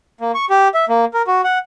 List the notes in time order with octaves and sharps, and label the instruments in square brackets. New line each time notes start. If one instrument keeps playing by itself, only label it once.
[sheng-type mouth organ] A#3
C#6
G4
E5
A#3
A#4
F#4
F#5